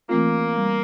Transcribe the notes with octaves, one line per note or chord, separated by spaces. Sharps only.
E3 A3 A#3 C4 F4
G3